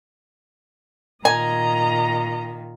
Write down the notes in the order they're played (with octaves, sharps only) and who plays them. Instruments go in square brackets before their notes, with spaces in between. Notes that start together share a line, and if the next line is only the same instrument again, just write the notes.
[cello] A#2 D#3 [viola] D#5 A#5 [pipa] G#5